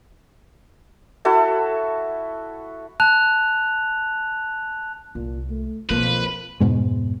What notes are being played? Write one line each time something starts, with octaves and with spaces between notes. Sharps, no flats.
E4 F#4 A4 E5
A5 F#6 F7
C2 A#2
A3
B1 F2 D3 F3 A#3 B4
F2 G#2 B2 G#3